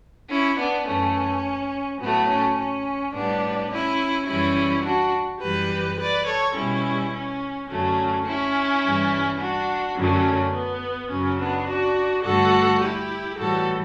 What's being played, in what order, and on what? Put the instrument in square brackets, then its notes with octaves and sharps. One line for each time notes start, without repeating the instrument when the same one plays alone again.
[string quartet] C#4 E4
B3 D4
F#2 E3 A3 C#4
A2 F#3 A3 B3
C#4
C#4
A2 G3 B3 D4
C#4 E4
F#2 E3 G3 C#4 E4
D4 F#4
F#2 E3 G3 G4 B4
B4 D5
A4 C#5
B2 G3 C#4 E4
C#4
F#2 D3 F#3 A3 C#4
C#4 E4
G2 E3 G3
D4 F#4
F#2 D3 F#3 A3 C#4
B3
F#2 C#3 F#3 C#4
B3 D4
D4 F#4
G2 D3 A3 F#4 A4
E4 G4
A2 E3 G3 F#4 A4